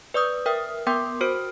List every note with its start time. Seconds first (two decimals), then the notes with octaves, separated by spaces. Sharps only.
0.14 B4 D5 C#6 D#6 G6
0.46 A#4 E5 G5 D#6 F6
0.87 B3 A#4 G5 C6 D6 G6
1.21 F#4 A#4 C5 F6 D7